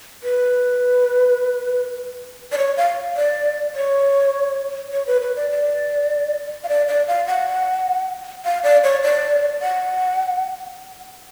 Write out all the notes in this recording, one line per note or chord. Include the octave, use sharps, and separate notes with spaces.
B4
D5
C#5
F5
D5
C#5
C#5
B4
B4
D5
D5
F5
D5
D5
F5
F#5
F5
D5
C#5
D5
F#5